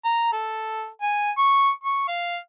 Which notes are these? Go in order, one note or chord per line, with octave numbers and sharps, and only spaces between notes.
A#5
A4
G#5
C#6
C#6
F5